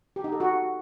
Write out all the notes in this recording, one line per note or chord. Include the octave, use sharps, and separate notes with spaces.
G4
D#4
A4
F#4